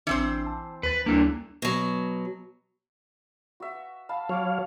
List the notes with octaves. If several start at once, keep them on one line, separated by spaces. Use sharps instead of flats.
A1 E3 C4 D4 C5
A5
D#2 B4 A6
D2 G3 A#3 D4 E4
B2 F#3
F#4 E5
F5 A5 B5
F#3 C#5 F5 C#6 D6